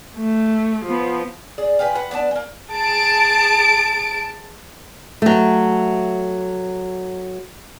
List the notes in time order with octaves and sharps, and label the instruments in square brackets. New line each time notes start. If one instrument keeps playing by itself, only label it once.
[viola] A3
F3 B3
[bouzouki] G#4 D5
F4 G4 G#4 B4
B4 F#5
B3 D4 D5 A5
G#3 A#3
[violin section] G#4 A5 D7
[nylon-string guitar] F#3 A3